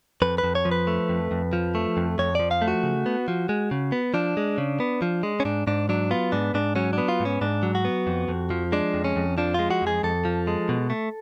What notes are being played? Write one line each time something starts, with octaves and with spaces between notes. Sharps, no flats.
F2 B4
B4
F2
C#5
F3
B4
A3
F2
F2
F3
A3
F2
F2 C#5
F3 D5
F5
A3
F#4
C#3
B3
F3
G#3
C#3
B3
F3 D4
G#3
C#3
B3
F3
G#3
C#4
G#2 D4
G#2 D4
F#3 D4
B3 F4
G#2 D4
G#2 D4
F#3 C#4
B3 D4
F4
G#2
C#4
G#2 D4
F#3
F#4
B3
F2
F2
F3
G#3 D4
F2
C#4
F2
F3 D4
G#3 F4
F#4
F2 G#4
F2 A4
F3
G#3
B2
A3